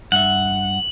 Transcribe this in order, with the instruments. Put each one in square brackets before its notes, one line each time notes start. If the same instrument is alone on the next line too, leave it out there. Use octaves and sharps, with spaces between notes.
[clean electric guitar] G2 E5 [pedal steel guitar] F#5 [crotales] F#7